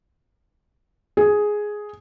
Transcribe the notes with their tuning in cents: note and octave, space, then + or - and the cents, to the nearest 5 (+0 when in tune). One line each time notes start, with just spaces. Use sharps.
G#4 +5